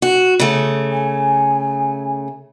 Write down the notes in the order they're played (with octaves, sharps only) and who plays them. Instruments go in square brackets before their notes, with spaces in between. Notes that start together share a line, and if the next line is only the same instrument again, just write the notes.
[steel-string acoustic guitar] F#4
C#3 A3
[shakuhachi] G#5